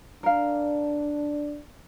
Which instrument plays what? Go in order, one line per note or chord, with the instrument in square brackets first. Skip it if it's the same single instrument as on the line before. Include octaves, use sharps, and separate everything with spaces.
[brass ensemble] D4 [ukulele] A#4 F5